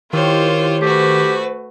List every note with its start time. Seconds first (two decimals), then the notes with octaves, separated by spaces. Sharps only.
0.13 D#3 E4 F4 G4 C5 C#5 D6
0.81 A3 F#4 G4 B4 C5